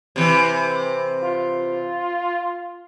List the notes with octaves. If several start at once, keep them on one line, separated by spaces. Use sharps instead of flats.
C3 E3
F4